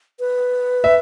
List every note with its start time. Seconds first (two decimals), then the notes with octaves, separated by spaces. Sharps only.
0.20 B4
0.84 E5